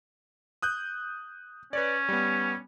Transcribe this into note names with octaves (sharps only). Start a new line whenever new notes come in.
D#6 F#6 G6
C#4 B4 C#5 D5
G3 B3